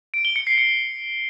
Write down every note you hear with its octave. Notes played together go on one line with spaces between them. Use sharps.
D7
G7
C#7
C7
C#7